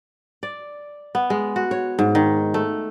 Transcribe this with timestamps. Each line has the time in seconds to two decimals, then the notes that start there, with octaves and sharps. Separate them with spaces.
0.43 D5
1.15 B3
1.30 G#3
1.56 F#4
1.71 C#5
1.99 G#2
2.15 D#3
2.54 A3